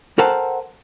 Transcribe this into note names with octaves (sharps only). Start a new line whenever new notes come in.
A4 A#4 C5 F#5 G5 A5